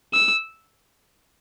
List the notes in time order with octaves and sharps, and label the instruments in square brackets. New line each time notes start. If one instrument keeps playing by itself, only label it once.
[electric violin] E6